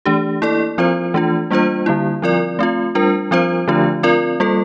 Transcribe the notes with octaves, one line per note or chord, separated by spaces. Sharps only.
E3 A3 D4 G4
A#3 E4 A4 D5
F3 C4 F4 C5
E3 A3 D4 F4
G3 A#3 D4 F4 C5
D3 G3 A#3 E4
F3 C4 F4 A#4 D5
A3 C4 F4
G3 D4 F4 A#4
F3 C4 F4 C5
D3 F3 A3 D4 F4
C4 F4 A#4 D5
G3 A#3 F4 A4